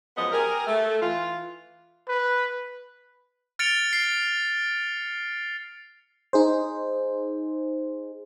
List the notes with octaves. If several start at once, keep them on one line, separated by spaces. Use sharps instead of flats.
F#2 F3 G#3 B3 D#5
G4 G#4 A#4
A3
E3 F4
B4
F6 A6 C#7 D7 F7
C7
D#4 G#4 C5